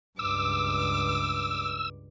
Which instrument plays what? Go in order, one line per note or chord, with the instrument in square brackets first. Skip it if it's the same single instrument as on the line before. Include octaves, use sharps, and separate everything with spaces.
[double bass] C#2 G2 [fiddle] D6 [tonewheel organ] E6